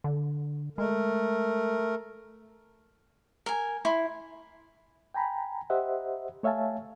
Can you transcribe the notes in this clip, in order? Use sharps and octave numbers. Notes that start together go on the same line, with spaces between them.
D3
G#3 A3 A#4
A#4 G#5
E4 C6
G5 G#5 A#5 B5
G4 C5 D#5 E5 F#5
A3 C#5 E5 F5 G#5 A5